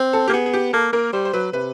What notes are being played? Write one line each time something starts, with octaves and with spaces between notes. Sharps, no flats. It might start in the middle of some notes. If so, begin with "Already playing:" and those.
Already playing: C4
A4
A#3 G4
B3 G#4
G#4
G4
A#3 A4
A#3 A#4
G3 C5
C5
F#3 B4
C3 B4